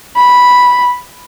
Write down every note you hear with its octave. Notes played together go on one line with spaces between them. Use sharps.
B5